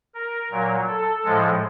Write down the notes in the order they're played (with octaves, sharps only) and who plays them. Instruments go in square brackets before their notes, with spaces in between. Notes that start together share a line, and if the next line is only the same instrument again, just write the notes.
[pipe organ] A#4
A#2 F#3
A4
A2 F3 G#3